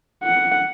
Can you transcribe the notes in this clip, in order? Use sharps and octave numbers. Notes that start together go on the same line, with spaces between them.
F#5